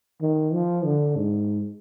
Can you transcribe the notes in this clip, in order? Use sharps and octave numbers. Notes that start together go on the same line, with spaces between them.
D#3
F3
D3
G#2